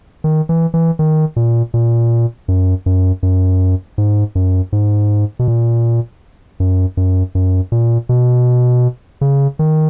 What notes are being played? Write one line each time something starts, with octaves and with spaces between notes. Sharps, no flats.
D#3
E3
E3
D#3
A#2
A#2
F#2
F#2
F#2
G#2
F#2
G#2
B2
A#2
F#2
F#2
F#2
A#2
B2
C#3
D#3